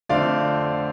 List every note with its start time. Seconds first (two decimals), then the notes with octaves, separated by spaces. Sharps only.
0.09 F2 D3 A3 C4 D5 F5